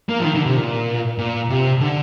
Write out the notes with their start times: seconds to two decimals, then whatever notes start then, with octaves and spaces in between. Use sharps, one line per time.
0.09 A#3
0.20 F3
0.24 D#3
0.35 D3
0.46 C3
0.56 A#2
1.18 A#2
1.50 C3
1.80 D3